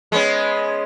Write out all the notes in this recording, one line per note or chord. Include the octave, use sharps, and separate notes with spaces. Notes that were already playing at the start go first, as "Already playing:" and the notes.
G#3 B3 C#4